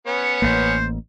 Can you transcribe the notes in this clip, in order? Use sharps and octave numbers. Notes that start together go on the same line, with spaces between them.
B3 C#4 C#5
A1 A#3 C5